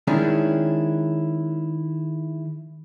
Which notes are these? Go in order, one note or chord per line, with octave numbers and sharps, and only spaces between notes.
D#3 G#3 C#4 D4 E4